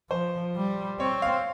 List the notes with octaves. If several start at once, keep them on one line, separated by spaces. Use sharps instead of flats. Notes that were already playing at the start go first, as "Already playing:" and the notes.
F3 C5
G3
C4 C#5
F5